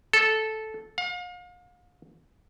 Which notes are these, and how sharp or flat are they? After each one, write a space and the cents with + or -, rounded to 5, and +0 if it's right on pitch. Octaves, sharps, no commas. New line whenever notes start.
A4 -10
F5 +40